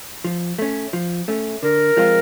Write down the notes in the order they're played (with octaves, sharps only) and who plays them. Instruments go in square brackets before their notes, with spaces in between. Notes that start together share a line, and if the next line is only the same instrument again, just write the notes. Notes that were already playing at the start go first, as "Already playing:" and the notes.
[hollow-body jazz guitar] F3
A3 C#4
F3
A3 C#4
[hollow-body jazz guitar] D3 [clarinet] A#4
[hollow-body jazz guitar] F3 G#3 C4 F4